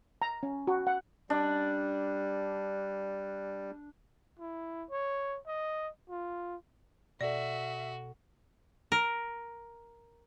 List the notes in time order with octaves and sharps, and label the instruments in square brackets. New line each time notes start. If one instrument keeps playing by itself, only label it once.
[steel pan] A#5
C#4
F#4
F#5
[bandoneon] G3 [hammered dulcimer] D4
[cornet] E4
C#5
D#5
F4
[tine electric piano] B2 A4 [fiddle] F#4 [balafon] D5 [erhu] E5
[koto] A#4